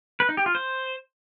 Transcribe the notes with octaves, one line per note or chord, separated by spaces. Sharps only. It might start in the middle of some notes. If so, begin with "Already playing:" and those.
B4
D#4
G4
F4
C5